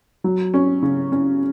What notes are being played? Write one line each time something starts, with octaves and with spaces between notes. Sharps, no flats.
F#3
C#4
C#3
C#4